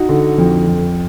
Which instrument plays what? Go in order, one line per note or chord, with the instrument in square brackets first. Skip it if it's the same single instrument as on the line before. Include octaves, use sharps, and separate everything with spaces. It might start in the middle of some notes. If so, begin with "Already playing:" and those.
Already playing: [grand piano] D#4 F#4
D3
F2
F2